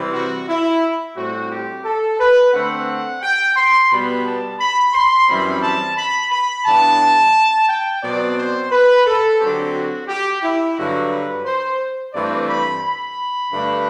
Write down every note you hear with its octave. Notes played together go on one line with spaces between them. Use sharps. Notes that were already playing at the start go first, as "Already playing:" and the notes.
Already playing: C3 E3 G3 C4
F#4
E4
A2 G3 C4 F#4
G4
A4
B4
D3 A3 C4 F#5
G5
C6
B2 G3 B3 B5
A5
B5
C6
F#2 E3 G3 C4 B5
A5
B5
B5
G2 E3 B3 D4 A5
G5
B2 F#3 C4 D5
C5
B4
A4
D3 F#3 C4 G4
F#4
G4
E4
G2 D3 F#3 F#4
B4
C5
G2 E3 A3 C4 D5
B5
B5
G2 D3 A3 D4